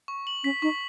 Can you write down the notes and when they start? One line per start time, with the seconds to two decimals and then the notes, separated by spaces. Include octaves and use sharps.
0.08 C#6
0.27 F#7
0.44 C#4 B6
0.62 D#4 C#6